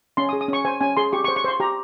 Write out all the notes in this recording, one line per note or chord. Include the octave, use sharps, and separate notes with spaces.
C#4 C6
D#6
G#4
D#6
C#4 C#6
C5 G#5
C#4 G#5
G#4 C6
G4 C#6
C#6
C5
C#6
C5 C6
G4 A#5